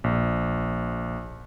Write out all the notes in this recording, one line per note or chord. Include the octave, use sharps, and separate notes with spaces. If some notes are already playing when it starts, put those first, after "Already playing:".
A#1